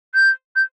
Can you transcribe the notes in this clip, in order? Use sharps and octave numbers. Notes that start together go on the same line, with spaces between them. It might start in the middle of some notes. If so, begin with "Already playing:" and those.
G6
G6